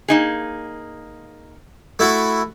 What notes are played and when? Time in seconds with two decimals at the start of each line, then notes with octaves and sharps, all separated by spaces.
0.08 A#3 D#4 G#4
1.99 A3 E4 F#4